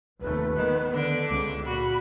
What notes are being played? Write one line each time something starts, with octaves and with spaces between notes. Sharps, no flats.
F1 D#2 A3 B4
D#3 B3
D3 D4
C#2 D6
A#2 F#4 B5